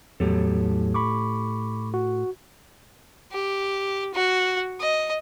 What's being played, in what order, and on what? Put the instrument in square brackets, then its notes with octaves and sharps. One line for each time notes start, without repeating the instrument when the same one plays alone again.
[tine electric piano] E2 F#3 [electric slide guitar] A2 G4 A4
[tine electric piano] B5 C#6 D6
F#4
[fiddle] G4
F#4
D#5